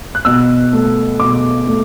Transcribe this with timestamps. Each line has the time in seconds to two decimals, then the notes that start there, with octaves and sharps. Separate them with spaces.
0.15 F#6
0.25 B2 E6
0.73 A3
1.20 B2 D6
1.67 A3